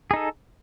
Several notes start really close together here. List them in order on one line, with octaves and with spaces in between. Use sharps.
G#4 D#4 A4